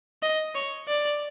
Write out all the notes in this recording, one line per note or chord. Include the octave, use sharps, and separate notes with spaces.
D#5
C#5
D5